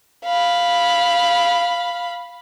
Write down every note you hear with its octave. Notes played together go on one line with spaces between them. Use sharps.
F5 B5